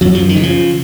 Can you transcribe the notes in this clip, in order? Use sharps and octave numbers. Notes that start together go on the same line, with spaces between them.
F#2 F#3
F3
D#3
C#3
F3